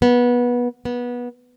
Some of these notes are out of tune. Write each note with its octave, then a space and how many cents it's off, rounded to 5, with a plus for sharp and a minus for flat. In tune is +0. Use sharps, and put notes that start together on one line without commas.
B3 -20
B3 -20